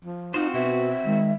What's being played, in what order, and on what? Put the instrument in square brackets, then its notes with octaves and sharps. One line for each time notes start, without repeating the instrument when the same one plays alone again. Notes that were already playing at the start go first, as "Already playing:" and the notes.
[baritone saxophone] F3
[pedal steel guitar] C4 F#4 C5 [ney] D#4 [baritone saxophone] F4
[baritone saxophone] B2 [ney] E5
[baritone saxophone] D#3 [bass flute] G#3